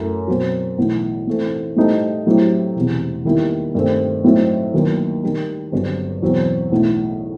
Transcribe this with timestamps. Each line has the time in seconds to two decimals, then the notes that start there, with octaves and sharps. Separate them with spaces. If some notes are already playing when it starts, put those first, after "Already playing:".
Already playing: F#2 F#3 A3 E4
0.28 B2 F#3 C4 F#4
0.78 B1 A2 E3
1.27 A2 E3 A3 C4
1.77 A2 G3 D#4 A4 C5
2.27 A2 F#3 C4 E4 G4
2.76 E1 E2 C3
3.25 D#2 D#3 G3 B3 E4
3.75 G2 D#3 A3 C4
4.24 A2 F#3 C4 D#4
4.74 D#2 D#3 F#3 B3
5.23 D#3 G3 D#4
5.72 G1 G2 F#3 C4
6.22 E2 B2 F#3 C4
6.72 B1 A2 E3